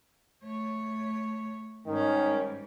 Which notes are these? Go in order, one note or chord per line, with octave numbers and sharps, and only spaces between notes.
A3 C#5
G#2 D#3 G3 C#4